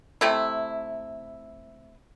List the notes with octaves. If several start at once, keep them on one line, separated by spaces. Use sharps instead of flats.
C3 A3 E4